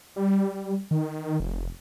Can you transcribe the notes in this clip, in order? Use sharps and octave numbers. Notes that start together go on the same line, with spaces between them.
G3
D#3
F1